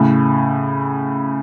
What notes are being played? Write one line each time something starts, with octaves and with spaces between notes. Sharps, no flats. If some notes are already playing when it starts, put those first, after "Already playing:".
Already playing: A2 C#3